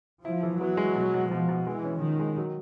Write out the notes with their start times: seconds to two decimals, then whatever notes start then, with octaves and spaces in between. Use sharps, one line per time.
0.24 F3 E4
0.43 E3
0.60 F#3 B3
0.77 G#3
0.95 B2
1.14 B2
1.31 B2 F3
1.48 B2
1.66 E3 G#3
1.84 C#4
2.01 D#3 F3
2.20 G#3
2.38 F#3